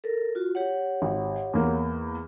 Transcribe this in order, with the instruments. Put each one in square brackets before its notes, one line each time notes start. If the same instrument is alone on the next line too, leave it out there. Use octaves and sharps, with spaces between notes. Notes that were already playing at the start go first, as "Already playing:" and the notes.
[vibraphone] A4 A#4
F4 F#4
G4 C#5 F#5
[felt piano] G#1
E2 A#3